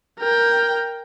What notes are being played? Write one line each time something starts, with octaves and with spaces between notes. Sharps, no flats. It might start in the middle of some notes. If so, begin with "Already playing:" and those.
A#4 G5